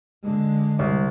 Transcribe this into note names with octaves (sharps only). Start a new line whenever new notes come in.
D3 G#3
C2